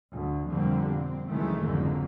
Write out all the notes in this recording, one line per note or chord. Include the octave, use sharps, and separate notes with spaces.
D2
F2 B2 D3 G3 A#3 C4
C4
C#2 D#3 E3 F#3 G#3 A3
F#1 F2 G#2 D3 A#3